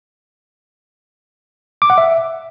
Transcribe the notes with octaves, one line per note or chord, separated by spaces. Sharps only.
D6
F#5
E5